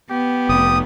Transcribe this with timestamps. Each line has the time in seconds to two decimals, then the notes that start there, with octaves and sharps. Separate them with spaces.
0.10 B3 G4
0.49 F1 D#6